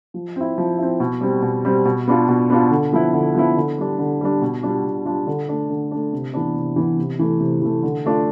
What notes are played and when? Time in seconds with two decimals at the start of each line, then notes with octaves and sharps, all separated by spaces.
0.14 F3
0.36 C4 E4
0.58 F3
0.78 C4 E4
1.00 B2
1.21 G3 C4
1.42 B2
1.65 G3 C4
1.85 B2
2.08 B3 D4 F4
2.28 B2
2.50 B3 D4 F4
2.70 D3
2.92 F3 B3 E4
3.13 D3
3.35 F3 B3 E4
3.56 D3
3.78 G3 D4
3.99 D3
4.21 G3 D4
4.41 B2
4.63 G3 D4 F4
4.84 B2
5.05 G3 D4 F4
5.27 D3
5.49 A3 D4
5.70 D3
5.91 A3 D4
6.13 C3
6.34 E3 B3 D4
6.56 C3
6.76 E3 B3 D4
6.98 C3
7.19 E3 A3
7.40 C3
7.62 E3 A3
7.83 D3
8.05 A3 D4 F4